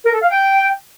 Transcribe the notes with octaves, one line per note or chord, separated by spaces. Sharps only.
A#4
A4
F5
G5